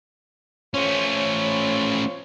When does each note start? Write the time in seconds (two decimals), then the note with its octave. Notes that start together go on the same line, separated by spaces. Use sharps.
0.74 A3 C#4 F4 C5 C#5